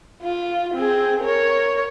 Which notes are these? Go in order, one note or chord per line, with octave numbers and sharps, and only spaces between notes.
F4
C4 G#4
A#4 C#5